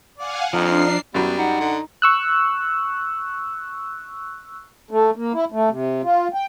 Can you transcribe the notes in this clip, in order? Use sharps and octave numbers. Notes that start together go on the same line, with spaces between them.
D5 F5 F#5 G#5
F2 F3 D4 D#4 A#5 F6 C7
F#2 F#3 G3 B3
D#4 F#5
D3
C#6 E6 F#6
A3
A#3
E4
A3
C3
F4
G5